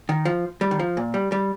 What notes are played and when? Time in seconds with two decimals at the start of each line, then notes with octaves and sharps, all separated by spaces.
0.09 D#3
0.25 F3
0.61 G3
0.71 D#3
0.79 F3
0.97 A#2
1.14 G3
1.32 G3